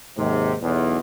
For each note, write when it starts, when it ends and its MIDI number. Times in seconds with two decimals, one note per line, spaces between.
0.17 0.54 39
0.17 0.54 44
0.17 0.54 48
0.61 0.98 35
0.61 0.98 40